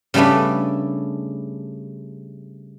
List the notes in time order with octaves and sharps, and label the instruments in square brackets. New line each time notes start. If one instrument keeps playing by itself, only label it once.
[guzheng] C#3 G3 A3 B3 D4